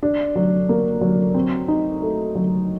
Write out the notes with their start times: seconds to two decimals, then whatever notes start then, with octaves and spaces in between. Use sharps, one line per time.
0.03 D4
0.36 F#3
0.69 A#3
1.01 F#3
1.34 C4
1.68 D#4
2.02 A3
2.35 F#3